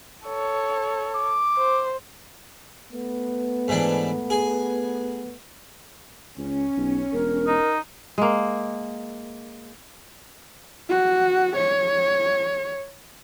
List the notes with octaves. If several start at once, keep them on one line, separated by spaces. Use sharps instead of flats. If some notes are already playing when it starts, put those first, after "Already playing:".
A4 C#5
D6
C5
A3 B3
G#2 E3 D4
G#4 G#5
C#2 C#4
B1
E1 A#4
D#4
G#3 A#3
F#4
C#5